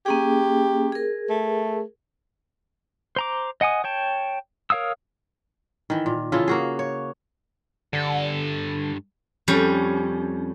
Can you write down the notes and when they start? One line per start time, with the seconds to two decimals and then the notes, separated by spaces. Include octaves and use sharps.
0.06 A#3 C#4 G4 G#4
0.92 G#4 A#4
1.30 A3
3.16 C5 A#5 D6
3.61 D#5 F#5 G#5 D#6
3.84 C#5 G5 A5
4.70 A#4 C#5 F5 D#6 E6
5.90 D#3 E3
6.06 A#2
6.32 C#3 E3 F4 A4
6.48 A#3 F#4 G#4
6.79 C#5
7.93 G2 D3 A4
9.48 F2 G3 C#4